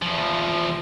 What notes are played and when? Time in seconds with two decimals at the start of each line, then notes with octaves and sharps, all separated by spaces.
0.02 E2 F3